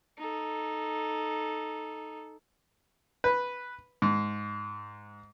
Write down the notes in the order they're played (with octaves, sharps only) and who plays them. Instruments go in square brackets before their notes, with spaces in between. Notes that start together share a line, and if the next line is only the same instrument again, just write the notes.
[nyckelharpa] D#4 A4
[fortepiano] B4
G#2